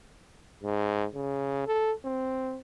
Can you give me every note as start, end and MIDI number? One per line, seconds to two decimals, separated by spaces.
0.63 1.06 44
1.15 1.65 49
1.67 1.93 69
2.05 2.59 60